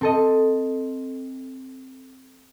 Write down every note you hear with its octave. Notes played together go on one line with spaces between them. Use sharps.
C4 A4 D#5